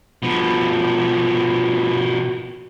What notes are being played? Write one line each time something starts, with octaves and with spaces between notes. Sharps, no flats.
B2 F3